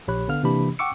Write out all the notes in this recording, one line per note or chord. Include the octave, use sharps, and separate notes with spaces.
A#1 G4 C#5 B5 F#6
D3 B3 F5 F6
C3 E3 A#3 D4 G4 B5
F#5 G5 C#6 D6 E6 C#7